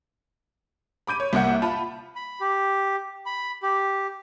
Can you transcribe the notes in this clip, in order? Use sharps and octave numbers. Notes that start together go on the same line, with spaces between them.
B5 D6 G6 D#7
C#5
C2 A#3 E5 F#5 G6
F4 A5 B5
B5
G4
B5
G4